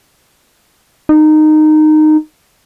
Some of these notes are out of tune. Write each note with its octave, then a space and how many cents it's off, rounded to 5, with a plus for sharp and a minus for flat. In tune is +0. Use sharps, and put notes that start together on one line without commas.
D#4 -15